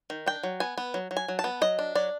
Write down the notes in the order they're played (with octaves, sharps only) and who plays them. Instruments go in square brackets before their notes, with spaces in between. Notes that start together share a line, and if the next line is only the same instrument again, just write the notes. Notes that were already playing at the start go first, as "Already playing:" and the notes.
[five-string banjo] D#3
D4 G5
F#3
B3 G#5
B3
F#3
F#3
G#5
F#3
A5
B3
F#3 D#5
D4
F#3 D5